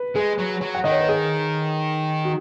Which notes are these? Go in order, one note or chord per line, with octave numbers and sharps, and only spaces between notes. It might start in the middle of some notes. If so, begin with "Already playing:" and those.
Already playing: B4
G#3 G#4
F#3
F#3
F#5
D#3 D#5
C#5
B4
G#4
F#4